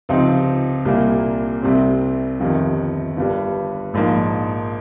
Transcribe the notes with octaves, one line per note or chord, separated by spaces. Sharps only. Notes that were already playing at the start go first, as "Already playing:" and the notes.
C#2 C3 F3 C4 D#4
C2 A#2 G3 A#3
C2 C3 G3 C4
G1 F2 C3 D#3
G1 G2 G3
A#1 G#2 F3 A#3